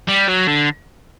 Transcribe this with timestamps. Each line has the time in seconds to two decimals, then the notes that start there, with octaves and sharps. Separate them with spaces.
0.09 G3
0.29 F#3
0.48 D3